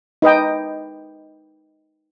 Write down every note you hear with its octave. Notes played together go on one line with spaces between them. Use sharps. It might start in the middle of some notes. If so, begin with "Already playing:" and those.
D#4 B4 D#5 G5